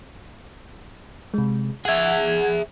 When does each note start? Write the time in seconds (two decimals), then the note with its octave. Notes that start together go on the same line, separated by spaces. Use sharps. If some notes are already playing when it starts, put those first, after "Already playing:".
1.34 C3 G#3
1.85 G#4 E5 F#5 G#6